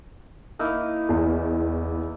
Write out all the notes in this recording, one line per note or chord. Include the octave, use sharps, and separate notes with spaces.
A#3 D#4 E4
E2